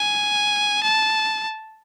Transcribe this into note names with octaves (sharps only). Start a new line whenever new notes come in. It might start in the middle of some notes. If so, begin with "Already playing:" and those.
Already playing: G#5
A5